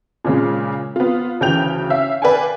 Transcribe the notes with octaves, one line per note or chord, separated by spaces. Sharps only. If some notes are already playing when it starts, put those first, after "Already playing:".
A#2 C#3 G#3
B3 F4
D2 C#3 E3 G5 G6 F7
C#4 E5 F5
B4 D5 F5 G5 G#5